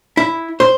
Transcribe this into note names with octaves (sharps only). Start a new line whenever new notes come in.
E4
C5